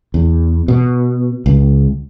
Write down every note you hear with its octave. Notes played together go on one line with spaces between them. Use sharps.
E2
B2
C#2